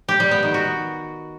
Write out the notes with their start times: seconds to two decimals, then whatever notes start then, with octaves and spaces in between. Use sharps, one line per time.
0.09 G4
0.20 G3
0.31 B3
0.43 D#3
0.54 F#4